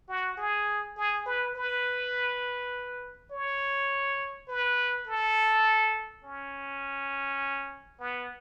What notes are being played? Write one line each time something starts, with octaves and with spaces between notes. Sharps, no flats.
F#4
G#4
G#4
B4
B4
C#5
B4
A4
C#4
B3